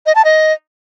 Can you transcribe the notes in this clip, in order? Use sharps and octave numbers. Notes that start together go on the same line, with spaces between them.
D#5
A5
D#5